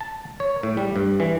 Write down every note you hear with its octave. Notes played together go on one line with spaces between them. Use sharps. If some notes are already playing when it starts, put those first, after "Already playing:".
A5
C#5
A2
G3
G2
E3